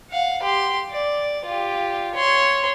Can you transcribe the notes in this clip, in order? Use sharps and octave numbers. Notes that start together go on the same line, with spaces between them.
F5 F#5
G4 C6
D5
F4 G4
C#5 C6